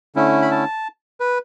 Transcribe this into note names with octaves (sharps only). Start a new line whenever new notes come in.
D3 A3 C#4 E4
B5
A5
B4